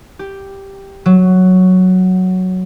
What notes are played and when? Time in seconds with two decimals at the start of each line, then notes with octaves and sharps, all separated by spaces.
0.19 G4
1.06 F#3